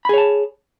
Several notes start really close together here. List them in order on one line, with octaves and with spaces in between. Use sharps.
B5 G#4 C#5 A5